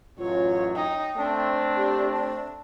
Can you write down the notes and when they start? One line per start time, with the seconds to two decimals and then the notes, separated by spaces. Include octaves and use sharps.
0.19 A1 F#2 F#3 F4 C#5
0.76 D#4 G5
1.17 A3 C4 D4
1.76 G4
2.12 A5